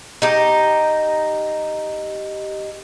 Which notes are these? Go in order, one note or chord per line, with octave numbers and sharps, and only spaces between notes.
D#4 G4